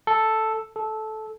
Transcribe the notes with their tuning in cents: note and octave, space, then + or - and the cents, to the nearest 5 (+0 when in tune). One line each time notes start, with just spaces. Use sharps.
A4 +0
A4 -15